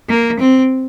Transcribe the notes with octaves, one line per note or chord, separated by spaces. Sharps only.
A#3
C4